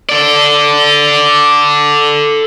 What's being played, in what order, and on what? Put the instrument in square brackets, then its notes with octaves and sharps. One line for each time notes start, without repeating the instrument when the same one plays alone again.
[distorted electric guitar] A4 D5